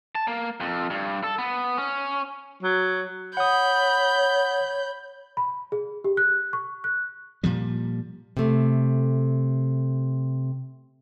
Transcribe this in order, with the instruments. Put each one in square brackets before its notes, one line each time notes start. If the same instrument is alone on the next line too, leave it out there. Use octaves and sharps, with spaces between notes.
[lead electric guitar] A5
A#3
F2
G2
A4
B3
C#4
[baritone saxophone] F#3
[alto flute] C#5 [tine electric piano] F#5 D#6 [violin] B5 G6
[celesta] B5
G#4
G4
F#6
C#6
F#6
[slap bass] A#2 F3 G3
[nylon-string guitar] C3 A3